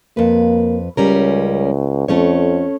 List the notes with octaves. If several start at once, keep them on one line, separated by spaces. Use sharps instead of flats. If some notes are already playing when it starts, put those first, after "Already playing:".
F2 A#3 B4
C#2 G3 C#4 A#4
F2 A3 C#4 C#5